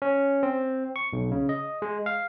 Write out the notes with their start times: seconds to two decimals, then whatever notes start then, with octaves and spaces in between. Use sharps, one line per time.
0.02 C#4
0.43 C4
0.96 C#6
1.13 B1
1.31 C#3
1.49 D#5
1.82 G#3
2.06 F5